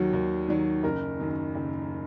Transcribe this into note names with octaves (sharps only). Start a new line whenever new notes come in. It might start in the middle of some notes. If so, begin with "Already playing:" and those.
Already playing: D#2 D#3 F#3 F#4
D#2
D#3 F#3
F#1 A#4
F#2 D#3
F#1